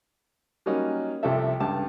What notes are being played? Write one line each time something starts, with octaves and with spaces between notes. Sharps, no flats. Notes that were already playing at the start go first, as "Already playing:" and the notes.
F#3 G3 A#3 C#4 D#4
C2 C3 F3 A4 E5
C#2 G2 G4 A5